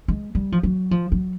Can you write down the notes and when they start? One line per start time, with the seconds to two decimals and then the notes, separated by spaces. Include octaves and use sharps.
0.08 G#3
0.35 G3
0.52 F3
0.63 F#3
0.91 F3
1.12 F#3